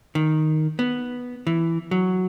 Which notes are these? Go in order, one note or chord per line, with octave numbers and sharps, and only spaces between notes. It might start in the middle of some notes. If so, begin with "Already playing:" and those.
D#3
B3
E3
F#3